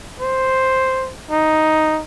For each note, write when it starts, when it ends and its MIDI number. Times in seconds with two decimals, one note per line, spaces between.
0.20 1.11 72
1.31 2.00 63